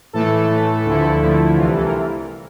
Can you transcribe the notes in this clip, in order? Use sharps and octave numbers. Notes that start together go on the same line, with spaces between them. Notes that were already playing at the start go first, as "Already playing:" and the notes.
A2 E3 A3 A4
A2 E3 A3
D2 D3 F3 A3 E4
D2 D3 F3 A3 E4
C2 C3 E3 F4
A4
A#4